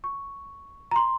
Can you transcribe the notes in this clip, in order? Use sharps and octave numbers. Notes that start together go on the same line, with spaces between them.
C#6
A#5
C6